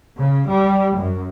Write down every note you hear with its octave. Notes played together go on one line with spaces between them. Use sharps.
C#3
G3
F#2